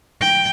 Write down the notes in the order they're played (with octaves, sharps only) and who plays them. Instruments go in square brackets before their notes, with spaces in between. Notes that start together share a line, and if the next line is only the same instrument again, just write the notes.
[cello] G5